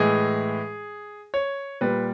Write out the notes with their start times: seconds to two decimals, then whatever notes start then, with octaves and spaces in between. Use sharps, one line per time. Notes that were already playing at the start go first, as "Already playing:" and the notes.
Already playing: A2 E3 G#3 G#4
1.34 C#5
1.81 A#2 G3 B4